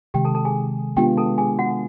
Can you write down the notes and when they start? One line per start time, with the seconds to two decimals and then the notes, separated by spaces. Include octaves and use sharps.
0.14 C3 D#3 G#3 G4 G5
0.25 A4 A5
0.35 A4 A5
0.45 G#4 G#5
0.97 G#3 B3 D4 F4 G4 G5
1.17 A4 A5
1.38 G#4 G#5
1.59 F#4 F#5